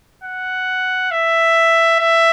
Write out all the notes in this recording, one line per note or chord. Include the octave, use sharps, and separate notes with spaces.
F#5
E5
E5